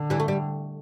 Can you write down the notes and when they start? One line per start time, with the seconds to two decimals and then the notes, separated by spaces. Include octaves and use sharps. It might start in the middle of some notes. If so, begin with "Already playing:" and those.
Already playing: D3
0.10 E3 G3
0.20 A3
0.28 G3